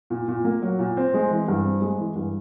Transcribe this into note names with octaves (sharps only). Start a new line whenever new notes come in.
A#2
A#2
A#3
F#3
A#2
C4
G#3
E3
G2
C4
G#3
E3
G2